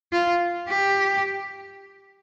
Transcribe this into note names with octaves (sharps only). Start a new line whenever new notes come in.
F4
G4